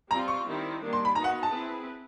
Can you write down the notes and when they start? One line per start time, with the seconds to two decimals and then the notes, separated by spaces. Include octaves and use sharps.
0.10 G3 C4 F4 A#5
0.28 C#6
0.46 D#3 G3 C4 E4
0.81 D#3 G3 A#3 D4
0.93 C6
1.05 B5
1.15 B3 D#4 F#4 A#5
1.24 F#5
1.43 A5
1.51 C4 E4 G#4 B4